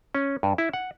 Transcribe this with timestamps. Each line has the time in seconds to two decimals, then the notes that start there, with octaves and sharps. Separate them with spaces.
0.15 C#4
0.43 G2
0.58 E4
0.73 F#5